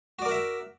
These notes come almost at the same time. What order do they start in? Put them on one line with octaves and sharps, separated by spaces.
F#4 D5 A#4 F#5 E5